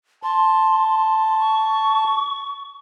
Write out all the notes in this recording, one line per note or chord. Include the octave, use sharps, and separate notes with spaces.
A5 C6
C#6